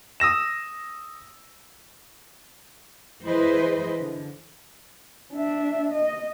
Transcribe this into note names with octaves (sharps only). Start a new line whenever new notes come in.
D#6 E6 A#6 E7
E3 E4 G#4 B4 C5 D#5
D3
D4 E5
D#5